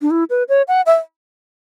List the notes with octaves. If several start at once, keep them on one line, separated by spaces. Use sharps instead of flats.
D4
E4
B4
C#5
F#5
E5